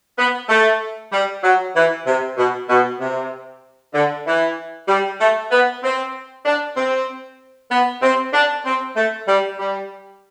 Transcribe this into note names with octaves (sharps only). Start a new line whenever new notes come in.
B3
A3
G3
F#3
E3
C3
B2
B2
C3
D3
E3
G3
A3
B3
C4
D4
C4
B3
C4
D4
C4
A3
G3
G3